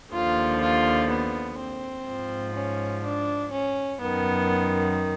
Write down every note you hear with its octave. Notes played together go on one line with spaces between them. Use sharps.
D#2 D3 F3 F4
F4
B3
C4
G#2 F3
C#4
D4
C#4
F#2 D#3 B3